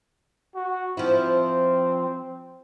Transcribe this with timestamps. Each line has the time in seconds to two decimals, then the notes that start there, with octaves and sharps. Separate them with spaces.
0.55 F#4
0.97 F3 C4 E4